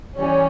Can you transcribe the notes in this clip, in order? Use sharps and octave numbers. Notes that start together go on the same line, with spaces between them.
E3 G3 C#4